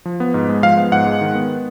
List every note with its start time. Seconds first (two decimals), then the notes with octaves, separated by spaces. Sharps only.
0.05 F3
0.20 B3
0.34 G#2
0.49 G#3
0.63 F3 F5
0.77 B3
0.92 G#2 F#5
1.06 G#3
1.21 D#3
1.35 B3